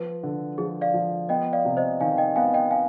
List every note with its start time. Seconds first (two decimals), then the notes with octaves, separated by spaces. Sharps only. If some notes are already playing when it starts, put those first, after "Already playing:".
Already playing: F3 B4
0.23 D3
0.58 F3 G#4
0.81 D5 F5
0.94 F3
1.29 B3 D#5 G5
1.53 D5 F5
1.65 C3
1.77 C5 D#5
2.00 D#3 F5 G#5
2.18 D#5 G5
2.36 B3 F5 G#5
2.53 D#5 G5
2.71 F5 G#5